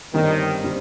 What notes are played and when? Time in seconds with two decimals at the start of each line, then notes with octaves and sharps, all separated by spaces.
0.14 G1 G2 D3 D#3 G3 C4
0.64 D3 G3 C4